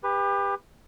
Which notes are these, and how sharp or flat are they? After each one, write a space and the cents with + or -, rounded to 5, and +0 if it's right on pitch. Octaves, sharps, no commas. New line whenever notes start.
G4 +30 B4 +0